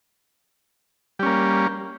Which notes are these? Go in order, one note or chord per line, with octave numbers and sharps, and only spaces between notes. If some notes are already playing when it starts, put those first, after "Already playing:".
G3 A#3 C#4